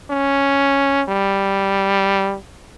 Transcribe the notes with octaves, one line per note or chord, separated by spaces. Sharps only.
C#4
G3